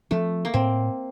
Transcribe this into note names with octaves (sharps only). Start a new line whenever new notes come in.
F3 A3 C4
A#3
A2 C4